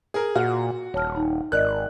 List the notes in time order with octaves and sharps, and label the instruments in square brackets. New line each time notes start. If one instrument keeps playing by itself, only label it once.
[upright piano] G#4 A#4
[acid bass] A#2 [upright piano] F#4 [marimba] F6
[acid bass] D#1 [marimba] C#5 A5 F6
[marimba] D#4
[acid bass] G#1 [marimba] A#4 D5 D#5 [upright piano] F#6